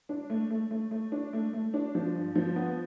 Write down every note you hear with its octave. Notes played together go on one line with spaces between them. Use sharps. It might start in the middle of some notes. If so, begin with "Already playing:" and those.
D4
A3
A3
A3
A3
D4
A3
A3
D4
F3
G2
F3
B3